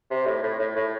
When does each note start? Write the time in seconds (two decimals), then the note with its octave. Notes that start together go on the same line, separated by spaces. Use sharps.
0.11 C3
0.27 A2
0.43 A2
0.59 A2
0.76 A2